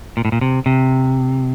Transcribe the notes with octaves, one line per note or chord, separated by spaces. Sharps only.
A#2
A2
A#2
C3
C3